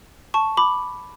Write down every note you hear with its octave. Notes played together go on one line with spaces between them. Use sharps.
A5 C#6
B5 D6